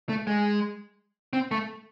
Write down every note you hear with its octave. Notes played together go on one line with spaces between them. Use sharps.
A3
G#3
C4
A3